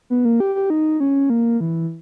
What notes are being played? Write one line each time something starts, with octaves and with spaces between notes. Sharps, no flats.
B3
A#3
G4
G4
D#4
C#4
A#3
E3